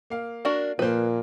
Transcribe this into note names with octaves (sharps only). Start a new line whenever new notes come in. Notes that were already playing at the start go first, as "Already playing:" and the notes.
A#3 F5
D4 F#4 A#4
A#2 F3 A#3 B4 C5